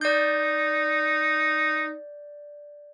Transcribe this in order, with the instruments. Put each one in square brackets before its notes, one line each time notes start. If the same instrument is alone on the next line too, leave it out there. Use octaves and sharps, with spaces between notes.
[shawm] D#4 [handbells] D5 G6